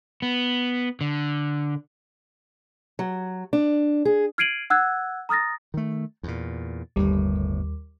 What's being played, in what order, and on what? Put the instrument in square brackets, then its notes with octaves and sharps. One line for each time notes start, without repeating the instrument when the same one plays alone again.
[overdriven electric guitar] B3
D3
[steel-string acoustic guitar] F#3
D4
G#4
[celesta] F6 G#6 C7 D7 D#7 F#7
F#5 E6 F#6 G#6
A#5 D#6 F6 A6 A#6
[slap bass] D#3 A3
E2 A#2
[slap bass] G1 A2 [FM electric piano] D#2 G3